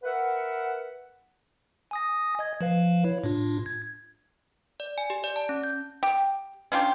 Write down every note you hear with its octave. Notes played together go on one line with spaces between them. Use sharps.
A#4 B4 E5 F#5
G#5 D#6 A#6
D#5 G#6
F3 B4 F5
E4 C#5
A2 D4 F4
G#6
D5
G#5
G4
D5
A5
C#4
G6
G4
C#4 D4 F4 G4